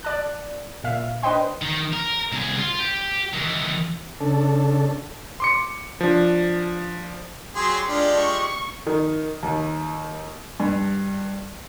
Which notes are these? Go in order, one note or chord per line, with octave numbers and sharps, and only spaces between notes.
D5 A5 F#6
A#2 E5 F5
D4 B4 C5 D#5 G5 C6
D#3
A#4
C2 G#4
F4
G4
D#3 E3
C#3 D4 A4
C6 D6 C#7
F3 D4
F#3 G4 G#4 C6
G#3 D4 F4 G4
C#6
D#3
D#2
G2